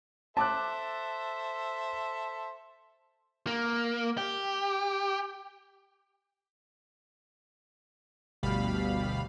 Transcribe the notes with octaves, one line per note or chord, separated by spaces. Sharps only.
A4 C5 E5 A5 D6 F#6
A#3
G4
G1 D2 B2 G3 F5 B5